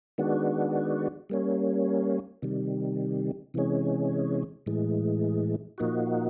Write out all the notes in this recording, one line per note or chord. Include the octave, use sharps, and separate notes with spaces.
D#3 G#3 B3 D4 F#4
G3 A#3 C#4
C3 D#3 G3
C3 E3 G#3 C#4
A2 E3 G#3
A#2 F3 A#3 D#4 F#4